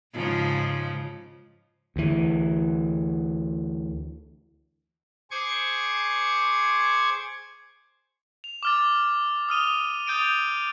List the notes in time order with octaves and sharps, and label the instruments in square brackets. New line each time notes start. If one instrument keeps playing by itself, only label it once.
[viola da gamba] G#2 C#3 F3
[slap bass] D2 E3
[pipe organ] G#4 C5 G#5 C#6 D6 G#6
[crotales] F7
D6 F6 A6
D#6 F6 D#7 G7
D#6 G6 A6 D7 D#7